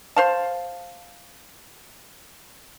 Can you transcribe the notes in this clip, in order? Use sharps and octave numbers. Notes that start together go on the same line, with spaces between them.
C5 F5 A5